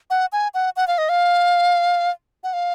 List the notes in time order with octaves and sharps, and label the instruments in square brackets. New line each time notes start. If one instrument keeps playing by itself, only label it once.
[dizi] F#5
G#5
F#5
F#5
F5
D#5
F5
F#5
F5